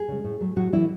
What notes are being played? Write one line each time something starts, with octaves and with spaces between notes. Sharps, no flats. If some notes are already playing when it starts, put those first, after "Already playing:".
Already playing: G#4
C#3 G#3
A2
F#3 A3
A2 F#3 F#4
E3 F#3 A3 E4